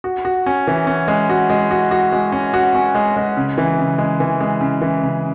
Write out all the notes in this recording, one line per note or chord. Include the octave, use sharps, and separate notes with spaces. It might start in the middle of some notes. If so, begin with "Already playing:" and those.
F#4
F#4
C#4
E3
C#4
G#3
F#4
G#3
F#4
F#4
G#3
C#4
F#4
C#4
G#3
G#3
C#3
E3
C#3
G#3
E3
G#3
C#3
E3
C#3